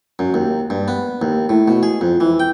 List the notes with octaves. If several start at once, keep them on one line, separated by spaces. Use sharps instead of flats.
F#2
D#2
G2
B3
D#2
A2
B2
G#4
F2
E3
G5